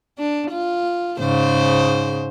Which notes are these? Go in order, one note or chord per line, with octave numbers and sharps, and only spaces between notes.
D4
F4
G#2 C#3 C5